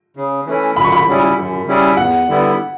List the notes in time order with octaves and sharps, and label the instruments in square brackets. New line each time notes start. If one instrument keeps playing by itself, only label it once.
[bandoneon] C#3
E3 A3 C#4 E4
[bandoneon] F#2 [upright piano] B5
[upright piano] C#6
B5
[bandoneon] C#3 G3 C#4 E4
F#2
C#3 G3 C#4 E4
[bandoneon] E2 [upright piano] F#5
[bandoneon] D3 G3 B3 E4